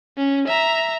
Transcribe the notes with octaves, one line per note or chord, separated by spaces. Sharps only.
C#4
E5 A#5